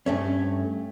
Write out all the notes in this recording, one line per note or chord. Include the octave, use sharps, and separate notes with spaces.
G2 A3 C#4